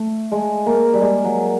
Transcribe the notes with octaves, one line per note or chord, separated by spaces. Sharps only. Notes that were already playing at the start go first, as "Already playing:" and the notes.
Already playing: A3
G#3
A#3
G3
G#3
F#3